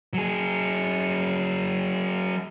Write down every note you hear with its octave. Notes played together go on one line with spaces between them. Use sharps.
F#3 G#4